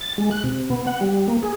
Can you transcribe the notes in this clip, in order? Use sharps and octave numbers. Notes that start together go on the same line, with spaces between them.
A6
G#3
F#6
C3
B3
F#5
G3
A#3
G#4